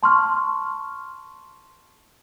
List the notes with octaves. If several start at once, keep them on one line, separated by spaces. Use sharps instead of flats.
A5 C6 C#6 F6